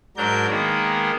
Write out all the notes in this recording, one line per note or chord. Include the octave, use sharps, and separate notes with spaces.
G#2 F#3 D4 A#4 G6
D#3 G#3 A#3 B3